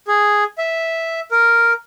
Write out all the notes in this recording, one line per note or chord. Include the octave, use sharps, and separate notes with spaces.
G#4
E5
A#4